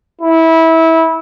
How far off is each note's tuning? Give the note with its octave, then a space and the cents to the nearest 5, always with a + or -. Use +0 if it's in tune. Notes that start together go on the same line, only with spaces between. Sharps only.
E4 -20